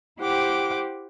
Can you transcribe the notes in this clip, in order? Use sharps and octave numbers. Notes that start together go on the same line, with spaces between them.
E4 G4 C5 F#5 G5 D6